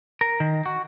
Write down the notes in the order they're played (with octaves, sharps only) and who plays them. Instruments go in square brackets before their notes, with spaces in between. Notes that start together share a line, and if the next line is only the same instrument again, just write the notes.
[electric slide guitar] A#4
D#3
F#4